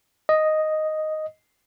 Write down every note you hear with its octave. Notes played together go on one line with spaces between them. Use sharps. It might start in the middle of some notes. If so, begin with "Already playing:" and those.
D#5